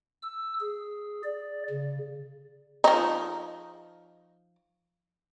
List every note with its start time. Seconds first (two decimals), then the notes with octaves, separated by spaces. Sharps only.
0.22 E6
0.60 G#4
1.23 D5
1.70 C#3
2.84 F3 D#4